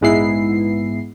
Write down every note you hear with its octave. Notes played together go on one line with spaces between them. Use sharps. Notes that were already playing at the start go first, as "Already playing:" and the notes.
A#1 G#2 G#3 B3 E4 C7